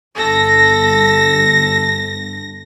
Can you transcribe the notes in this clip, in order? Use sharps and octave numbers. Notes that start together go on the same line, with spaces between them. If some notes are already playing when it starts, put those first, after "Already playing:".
G1 A4 A#6